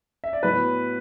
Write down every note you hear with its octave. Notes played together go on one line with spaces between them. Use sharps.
E5
D5
A2 F#3 B3 B4